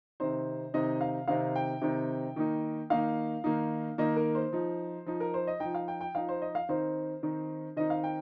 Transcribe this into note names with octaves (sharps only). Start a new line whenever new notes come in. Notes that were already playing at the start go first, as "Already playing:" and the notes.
C3 D#3 C4 D#4 C5
C3 D#3 C4 D#4 D#5
F5
C3 D#3 C4 D#4 F5
G5
C3 D#3 C4 D#4
D#3 A#3 D#4
D#3 A#3 D#4 F5
D#3 A#3 D#4
D#3 A#3 D#4 D#5
A#4
C5
F3 D#4
F3 D#4
A#4
C5
D#5
F3 D#4 G5
F5
G5
G5
F3 D#4 F5
C5
D#5
F5
D#3 C4 D#4 C5
D#3 C4 D#4
D#3 C4 D#4 D#5
F5
G5